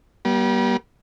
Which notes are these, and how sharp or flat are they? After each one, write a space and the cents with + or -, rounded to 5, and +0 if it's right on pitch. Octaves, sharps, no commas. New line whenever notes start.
G3 -20 B3 -45